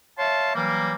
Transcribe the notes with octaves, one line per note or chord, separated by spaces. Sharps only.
C#5 E5 F5 A5 C6
E3 F#3 G3 A#3